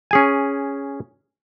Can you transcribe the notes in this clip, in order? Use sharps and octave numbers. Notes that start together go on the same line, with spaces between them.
C#4 G#4 G#5